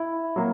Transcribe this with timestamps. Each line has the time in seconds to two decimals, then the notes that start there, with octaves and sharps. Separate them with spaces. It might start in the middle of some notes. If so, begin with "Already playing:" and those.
Already playing: E4
0.36 F#3 A#3